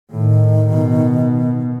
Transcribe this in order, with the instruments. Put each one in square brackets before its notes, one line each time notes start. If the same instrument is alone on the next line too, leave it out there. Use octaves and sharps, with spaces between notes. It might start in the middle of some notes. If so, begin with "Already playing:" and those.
[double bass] A2 [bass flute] D#3
[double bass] B2